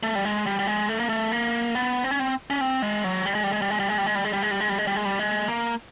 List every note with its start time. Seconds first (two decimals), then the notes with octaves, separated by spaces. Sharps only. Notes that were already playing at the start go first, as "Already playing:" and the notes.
0.03 A3
0.15 G3
0.25 G#3
0.46 G3
0.59 G3
0.67 G#3
0.89 A3
1.00 A#3
1.09 A3
1.32 A#3
1.75 B3
2.04 C4
2.11 C#4
2.19 C4
2.50 C#4
2.61 C4
2.82 G#3
3.04 F#3
3.26 G3
3.35 G#3
3.44 G3
3.52 G#3
3.62 G3
3.70 G#3
3.80 G3
3.89 G#3
3.98 G3
4.06 G#3
4.15 G3
4.24 G#3
4.33 G3
4.42 G#3
4.51 G3
4.60 G#3
4.69 G3
4.78 G#3
4.87 G3
4.96 G#3
5.05 G3
5.19 G#3
5.48 A#3